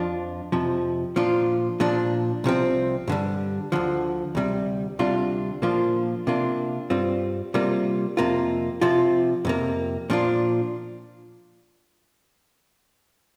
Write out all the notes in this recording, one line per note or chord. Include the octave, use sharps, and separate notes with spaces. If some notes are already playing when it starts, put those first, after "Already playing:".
Already playing: F2 F3 D4 F4
F2 C3 F3
A#2 F3 D4 F4
A#2 F3 D4
C2 C3 F3 C4
G2 D3 G3
D2 D3 F3
D2 C3 G3
D2 C3 G3 D4 F4
A#2 F3 A#3 D4 F4
C3 A#3 D4 F4
G2 G3 C4 F4
C3 G3 A#3 F4
F2 C3 A#3 F4
C3 F3 C4 F4
F2 C3 A#3
A#2 F3 D4 F4